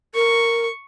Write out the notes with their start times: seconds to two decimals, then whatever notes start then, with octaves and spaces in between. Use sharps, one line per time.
0.15 A#4 C#6